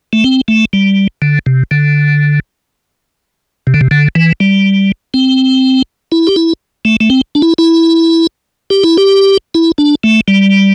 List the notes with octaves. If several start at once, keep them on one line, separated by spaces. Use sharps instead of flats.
A3
C4
A3
G3
D3
C3
D3
C3
D3
C3
D3
E3
G3
C4
E4
G4
E4
A3
A3
C4
D4
E4
E4
G4
E4
G4
E4
D4
A3
G3